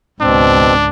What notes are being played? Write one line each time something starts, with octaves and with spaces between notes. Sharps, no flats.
G#1 C#2 B2 C4 D4